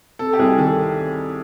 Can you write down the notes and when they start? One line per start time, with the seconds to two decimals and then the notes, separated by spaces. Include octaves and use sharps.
0.19 C3 A4
0.33 G4
0.39 C2 G#4
0.58 D#3 A4